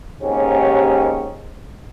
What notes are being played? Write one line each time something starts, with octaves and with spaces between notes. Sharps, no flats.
D#2 G#2 C4 C#4 G4